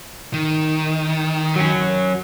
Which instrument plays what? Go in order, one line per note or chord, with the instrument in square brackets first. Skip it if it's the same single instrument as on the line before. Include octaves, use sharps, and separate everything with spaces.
[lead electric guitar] D#3
[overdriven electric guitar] F#3 C#4